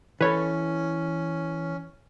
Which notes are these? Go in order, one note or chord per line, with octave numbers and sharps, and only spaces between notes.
E3 C#4 A4 B4 C#5